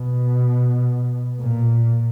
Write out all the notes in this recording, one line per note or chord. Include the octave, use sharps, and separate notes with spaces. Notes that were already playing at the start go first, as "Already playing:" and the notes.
Already playing: B2
A#2